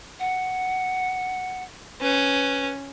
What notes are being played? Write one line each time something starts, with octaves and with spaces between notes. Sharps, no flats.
F#5
C#4 B4